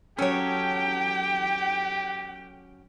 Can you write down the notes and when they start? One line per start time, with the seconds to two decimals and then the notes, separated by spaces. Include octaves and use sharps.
0.19 F#3 C#4 G4 A4 C#5 G5